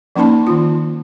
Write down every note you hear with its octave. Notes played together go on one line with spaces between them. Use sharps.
F3 A#3 C#4 D#4 A5 B5
D#3 F4